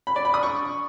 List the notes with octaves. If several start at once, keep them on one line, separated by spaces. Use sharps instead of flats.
B5
D5
B5
D#6
C#6